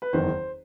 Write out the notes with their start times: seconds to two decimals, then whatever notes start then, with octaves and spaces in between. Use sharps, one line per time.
0.02 B4
0.13 F#1 E2 D#3 C5